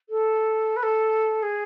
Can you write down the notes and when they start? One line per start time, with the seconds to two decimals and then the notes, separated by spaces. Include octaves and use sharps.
0.09 A4
0.76 B4
0.83 A4
1.42 G#4